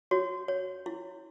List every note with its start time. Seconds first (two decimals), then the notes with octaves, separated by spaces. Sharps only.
0.11 F#4 C#5
0.48 C#5
0.86 E4